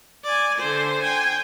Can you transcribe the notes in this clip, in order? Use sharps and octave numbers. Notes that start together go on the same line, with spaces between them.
D5 G#5
D3 C5
G5 G#5